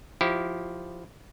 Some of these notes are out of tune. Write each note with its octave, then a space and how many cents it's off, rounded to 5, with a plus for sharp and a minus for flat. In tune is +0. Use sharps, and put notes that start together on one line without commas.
F3 +0 E4 +0 G4 -20